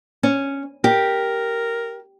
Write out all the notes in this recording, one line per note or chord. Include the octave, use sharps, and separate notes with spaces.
C#4
G4 A#4